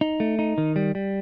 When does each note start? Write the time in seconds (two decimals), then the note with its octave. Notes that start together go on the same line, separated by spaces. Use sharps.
0.01 D#4
0.20 A3
0.39 D#4
0.58 D#3
0.76 G3
0.95 G3